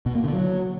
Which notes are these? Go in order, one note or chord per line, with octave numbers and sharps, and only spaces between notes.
B2
A#3
D3
F#3